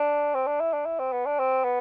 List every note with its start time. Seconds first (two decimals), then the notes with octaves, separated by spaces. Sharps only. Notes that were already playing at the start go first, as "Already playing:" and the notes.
Already playing: D4
0.35 C4
0.47 D4
0.61 E4
0.73 D4
0.86 E4
0.99 C4
1.12 B3
1.26 D4
1.39 C4
1.64 B3